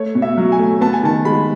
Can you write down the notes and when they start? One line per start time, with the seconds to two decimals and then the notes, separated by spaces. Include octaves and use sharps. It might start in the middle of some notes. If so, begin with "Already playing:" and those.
Already playing: A3 C#5
0.15 B2
0.22 E5
0.37 F#3
0.52 G#5
0.59 A3
0.81 B3 A5
0.93 G#5
1.03 D#3 A5
1.25 G#3 B5